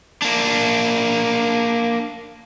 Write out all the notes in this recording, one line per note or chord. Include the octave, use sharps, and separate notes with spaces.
A#3 D4